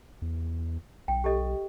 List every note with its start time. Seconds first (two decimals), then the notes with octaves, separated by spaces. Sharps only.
0.22 E2
1.08 B1 G5
1.24 G4 A4 D#5